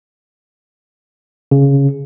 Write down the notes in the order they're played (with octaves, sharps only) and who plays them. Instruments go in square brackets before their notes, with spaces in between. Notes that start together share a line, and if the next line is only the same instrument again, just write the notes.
[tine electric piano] C#3